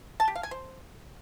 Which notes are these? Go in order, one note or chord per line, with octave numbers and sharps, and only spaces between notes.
A5
G4
F5
G#5
C5